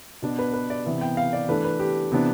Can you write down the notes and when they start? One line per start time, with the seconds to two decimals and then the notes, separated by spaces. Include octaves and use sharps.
0.22 B2 B3 D4
0.39 B4
0.54 B4
0.70 D5
0.86 C3 E3 B3 E5
1.01 G5
1.17 F5
1.33 D5
1.48 E3 A3 D4 B4
1.64 B4
1.80 G4
2.12 C3 E3 B3 D4